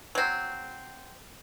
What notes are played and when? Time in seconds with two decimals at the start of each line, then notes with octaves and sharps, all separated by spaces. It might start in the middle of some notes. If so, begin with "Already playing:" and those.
0.15 F#3 C4